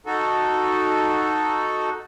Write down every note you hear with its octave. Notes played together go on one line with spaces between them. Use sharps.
D#4 F#4 A4